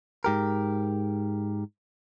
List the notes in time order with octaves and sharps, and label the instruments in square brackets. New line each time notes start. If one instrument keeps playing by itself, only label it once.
[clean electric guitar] G#2 G4 A#4